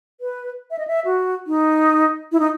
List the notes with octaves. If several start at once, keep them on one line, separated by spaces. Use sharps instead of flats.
B4
E5
D#5
E5
F#4
D#4
E4
D#4